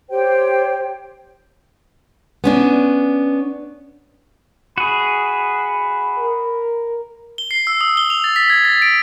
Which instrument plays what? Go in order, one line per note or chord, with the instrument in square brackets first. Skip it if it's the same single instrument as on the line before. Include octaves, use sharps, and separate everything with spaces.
[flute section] G4 C5 C#5 G5
[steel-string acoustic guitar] B3 C#4 D4
[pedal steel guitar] F#4 G#4 [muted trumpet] B5
[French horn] A#4
[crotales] G7
C7
E6
D#6
G7
F7
A6
B6
G#6
A6
D7